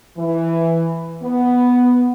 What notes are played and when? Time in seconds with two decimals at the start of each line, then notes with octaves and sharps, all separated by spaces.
0.18 E3
1.23 B3